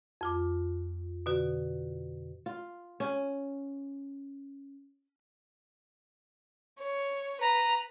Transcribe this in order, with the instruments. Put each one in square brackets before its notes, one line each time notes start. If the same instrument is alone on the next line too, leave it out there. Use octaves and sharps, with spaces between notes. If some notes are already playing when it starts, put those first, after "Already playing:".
[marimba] F2 F4 D6
B2 D3 F#4
[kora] F4
C#4
[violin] C#5
[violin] B4 [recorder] A#5